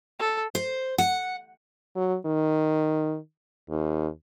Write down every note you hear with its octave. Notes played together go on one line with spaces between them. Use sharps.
A4
C5
F#5
F#3
D#3
D#2